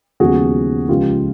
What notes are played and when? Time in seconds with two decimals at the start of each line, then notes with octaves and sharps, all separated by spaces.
0.20 D#2 C#3 F3 G#3 B3 F#4 G#4
0.89 C#2 C#3 F3 G#3 F4 G4